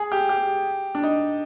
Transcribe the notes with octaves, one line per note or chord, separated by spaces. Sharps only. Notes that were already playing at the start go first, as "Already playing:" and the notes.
Already playing: G#4
G4
G4
D4
D#4